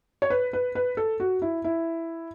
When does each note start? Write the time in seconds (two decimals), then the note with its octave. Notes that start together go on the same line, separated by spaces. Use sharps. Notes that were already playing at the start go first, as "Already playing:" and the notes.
0.22 C#5
0.30 B4
0.53 B4
0.75 B4
0.97 A4
1.20 F#4
1.42 E4
1.64 E4